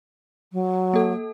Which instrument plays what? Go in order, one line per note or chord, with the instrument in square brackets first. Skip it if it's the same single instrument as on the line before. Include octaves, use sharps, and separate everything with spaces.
[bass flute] F#3
[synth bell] A#3 A4